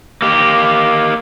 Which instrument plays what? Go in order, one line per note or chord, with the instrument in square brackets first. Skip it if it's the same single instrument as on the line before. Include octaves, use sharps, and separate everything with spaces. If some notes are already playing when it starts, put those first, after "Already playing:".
[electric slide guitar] A#3 G4